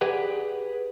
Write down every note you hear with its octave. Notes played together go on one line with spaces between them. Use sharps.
G4 G#4 B4 D5 F#5